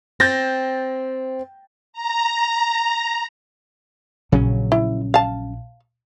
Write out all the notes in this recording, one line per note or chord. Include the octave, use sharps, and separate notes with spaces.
C4 G6 A6 A#6
A#5
A#1 C#3 F#3 C#4
E4
F5 A5